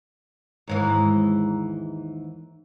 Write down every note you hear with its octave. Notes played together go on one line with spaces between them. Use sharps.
D#2 G#2 E3